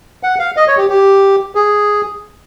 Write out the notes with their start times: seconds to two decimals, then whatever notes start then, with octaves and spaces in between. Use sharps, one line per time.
0.23 F#5
0.39 F5
0.57 D#5
0.68 C#5
0.78 G4
0.90 G4
1.55 G#4